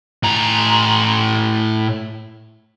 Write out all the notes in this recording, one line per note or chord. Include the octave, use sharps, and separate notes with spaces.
A2 A#5